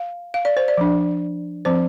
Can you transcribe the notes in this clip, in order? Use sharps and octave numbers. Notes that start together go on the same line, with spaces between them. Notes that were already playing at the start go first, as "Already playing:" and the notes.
Already playing: F5
F5
D5
C5
D5
F3 D4
F3 C4 C5